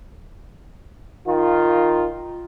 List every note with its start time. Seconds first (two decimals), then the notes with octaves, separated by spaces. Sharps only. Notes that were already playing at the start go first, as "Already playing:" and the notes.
1.27 D#3 F4